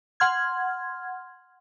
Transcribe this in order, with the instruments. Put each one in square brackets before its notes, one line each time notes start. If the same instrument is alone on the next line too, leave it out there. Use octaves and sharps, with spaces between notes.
[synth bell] F#5 C6 F6 G#6